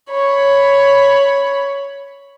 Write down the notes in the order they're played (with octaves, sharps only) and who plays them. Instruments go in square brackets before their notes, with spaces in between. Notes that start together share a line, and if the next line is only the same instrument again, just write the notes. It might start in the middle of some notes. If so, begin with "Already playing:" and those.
[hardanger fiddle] C#5 B5